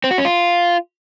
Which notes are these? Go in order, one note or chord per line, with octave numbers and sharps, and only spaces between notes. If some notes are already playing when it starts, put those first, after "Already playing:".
C4
F#4
C#4
F4